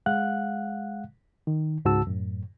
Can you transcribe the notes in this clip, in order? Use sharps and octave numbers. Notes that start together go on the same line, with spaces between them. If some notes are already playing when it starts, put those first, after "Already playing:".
G#3 F5 F#5 F#6
D#3
C#2 G#2 F#4 A5 E6
F#2 A2